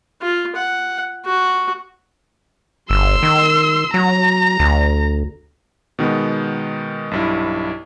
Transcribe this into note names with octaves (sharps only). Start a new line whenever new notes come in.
F4
F#5
F#4
G1 C6 E6
D#3
F#3 A#5
D2
B2 D#3 G#3 B3
B1 G2 E4